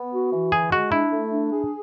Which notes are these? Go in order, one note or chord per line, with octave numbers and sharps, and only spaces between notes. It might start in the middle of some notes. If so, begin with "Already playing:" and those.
Already playing: B3
F#4
E3
D3 G#4
G#3 F#4
D4 E4
A3
D4
G#4